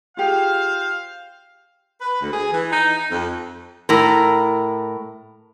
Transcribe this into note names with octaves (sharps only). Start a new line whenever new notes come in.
F4 G4 G#4 C5 F5
B4
D2
G#4
E3
D#4
D#4
F2
A2 A#4